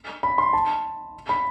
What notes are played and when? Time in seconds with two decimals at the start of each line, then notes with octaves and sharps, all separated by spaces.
0.23 B5
0.38 C6
0.53 A5
1.29 B5